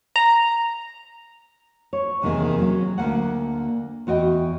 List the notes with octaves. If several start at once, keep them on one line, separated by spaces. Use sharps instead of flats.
A#5
C#5
E2 C3 D#3 A#3 G#4
F#3 C#4
D2 A#3 F#5
E2 F#4 D#5 G5